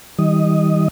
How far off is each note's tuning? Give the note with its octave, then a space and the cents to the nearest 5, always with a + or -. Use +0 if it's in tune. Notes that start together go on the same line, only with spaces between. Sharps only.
D#3 +45 G3 +0 D#5 +0